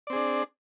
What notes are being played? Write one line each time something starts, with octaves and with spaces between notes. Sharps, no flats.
C4 D4 G#4 D5